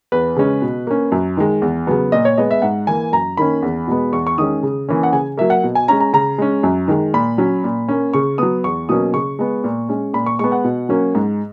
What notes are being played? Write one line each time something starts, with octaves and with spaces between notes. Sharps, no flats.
E2 B4
C#3 G#3 C#4
B2
A#3 C#4
F#2
D#3 G#3
E2
C#3 F#3 B3
A#2 D#5
C#5
G#3 B3 D#5
E5
G#2 F#5
E3 A#3 G#5
F#2 A#5
D#3 A#3 C#4 B5
E2
B2 G#3 B3
E2 C#6
C#6
D#3 G#3 C#4 D#6
C#3
E3 A#3 C#4
F#5
C#3 G#5
F#3 A#3 E5
F#5
B2
G#5
G#3 C#4 A#5
A#5
C#3 A#5
G#3 C#4
F#2
D#3 G#3
A#2 B5
F#3 C#4
A#2
A#3 C#4
C#3 C#6
F#3 B3 D#6
E2 C#6
B2 F#3 A#3 C#4 D#6
C#3 C#6
G#3 B3
A#2
G#3 C#4
A#2 B5
C#6
G#3 B3 C#6
F#5
B2
F#3 A#3 C#4
G#2